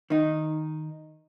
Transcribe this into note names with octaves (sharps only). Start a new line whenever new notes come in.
D#3 D#4